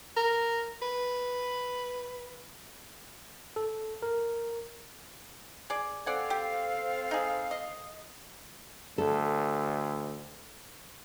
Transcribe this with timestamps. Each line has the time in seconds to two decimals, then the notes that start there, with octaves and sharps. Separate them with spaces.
0.17 A#4
0.82 B4
3.56 A4
4.02 A#4
5.70 G#4 D5
6.06 C4 A4 D5 F5 F#5 G#5
6.30 G4
7.11 D#4 G#4
7.51 D#5
8.98 D2 A4